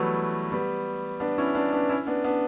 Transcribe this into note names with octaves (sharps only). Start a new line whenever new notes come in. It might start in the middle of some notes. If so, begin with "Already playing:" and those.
Already playing: E3 F#3 G3 A3 B3
G3 B3
B3 D4
C#4 E4
B3 D4
B3 D4
C#4 E4
B3 D4
B3 D4